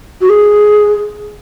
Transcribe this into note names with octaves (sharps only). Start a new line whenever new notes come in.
F#4
G#4